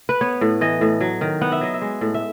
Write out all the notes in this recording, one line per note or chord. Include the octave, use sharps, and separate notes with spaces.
B4
B3 C#5
A2
E3 D#5
A2
F#3
D#3
B3 F#5
E5
F#3 D#5
E5
G#3
A2
E5